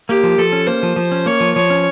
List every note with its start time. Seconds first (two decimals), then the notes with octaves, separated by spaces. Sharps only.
0.09 A#3 G4
0.23 F3
0.38 F3 A4
0.52 C#4
0.67 A#3 C5
0.83 F3
0.96 F3
1.12 C#4
1.26 A#3 C#5
1.40 F3
1.55 F3 C#5
1.70 C#4